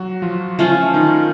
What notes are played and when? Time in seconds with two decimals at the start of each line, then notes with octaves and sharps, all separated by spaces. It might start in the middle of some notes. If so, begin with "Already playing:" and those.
Already playing: F#3 F#4
0.22 F3 F4
0.59 F3 A3 C#4 F4
0.94 D#3 D#4